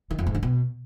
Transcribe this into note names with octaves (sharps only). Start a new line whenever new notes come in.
D#3
F2
G#2
D3
B2